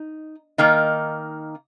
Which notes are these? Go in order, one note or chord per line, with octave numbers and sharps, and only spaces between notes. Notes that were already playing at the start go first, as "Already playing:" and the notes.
Already playing: D#4
D#3 A#3 D#4